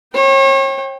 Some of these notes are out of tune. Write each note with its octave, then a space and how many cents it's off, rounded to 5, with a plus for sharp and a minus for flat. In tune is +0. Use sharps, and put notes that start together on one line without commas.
C#5 -40 G5 +0